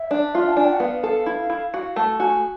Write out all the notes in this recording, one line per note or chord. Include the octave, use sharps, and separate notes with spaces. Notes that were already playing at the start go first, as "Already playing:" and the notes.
Already playing: E5
D4
F4
A5
D4 G#5
G5
F#5
B3 F5
A4
E4
E4
F#4 F5
A3 A5
F#4 G#5